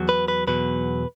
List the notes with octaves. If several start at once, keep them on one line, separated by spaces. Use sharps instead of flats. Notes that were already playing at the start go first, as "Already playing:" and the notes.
Already playing: E2 F#3
B4
B4
E2 B2 F#3 B4